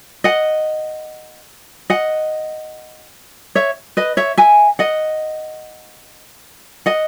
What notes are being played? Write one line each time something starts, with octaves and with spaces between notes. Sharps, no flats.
D#5 F#5
D#5 F#5
C#5 E5
B4 D#5
C#5 E5
E5 G#5
D#5 F#5
D#5 F#5